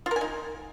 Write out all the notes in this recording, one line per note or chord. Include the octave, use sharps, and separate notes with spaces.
F4
A#4
G#5
D#4